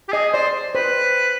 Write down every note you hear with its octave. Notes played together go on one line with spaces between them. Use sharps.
G4
G#4 D#5
C5 D5
B4 C5